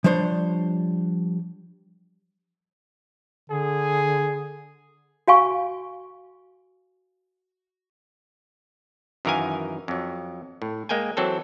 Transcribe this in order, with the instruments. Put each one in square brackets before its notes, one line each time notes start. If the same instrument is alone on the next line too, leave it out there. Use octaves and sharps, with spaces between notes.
[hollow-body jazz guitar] F3 G3 D4 C5 C#5
[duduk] D3 [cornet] G#4
[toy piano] F#4 F5 G#5 C#6
[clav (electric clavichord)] F#2 D#3 E3 A#4 F5 G#5
F2 F#3
A2
G#3 A#3 G5 G#5
E3 F#3 C4 A4